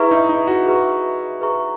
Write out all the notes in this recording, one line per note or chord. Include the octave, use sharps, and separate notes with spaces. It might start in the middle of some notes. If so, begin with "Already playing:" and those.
Already playing: E4 G#4 B4 E5 A#5 C#6
D#4
D#4
F#4
G#4 B4 E5 A#5 C#6
G#4 B4 E5 A#5 C#6